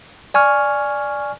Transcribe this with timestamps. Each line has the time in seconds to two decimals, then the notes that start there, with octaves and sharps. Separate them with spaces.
0.34 D5 G#5 C#6 F6